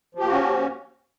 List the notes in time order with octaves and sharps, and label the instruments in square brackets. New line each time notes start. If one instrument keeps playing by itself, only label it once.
[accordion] F3
G4
A#3
F#4
C#4